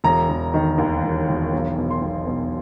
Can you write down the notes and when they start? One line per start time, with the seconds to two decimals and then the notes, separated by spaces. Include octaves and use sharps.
0.04 E1 A#5
0.30 E1
0.54 D#3
0.78 D#2
1.04 E1
1.29 E1
1.53 B1
1.78 B2
1.90 C6
2.02 B1
2.27 B2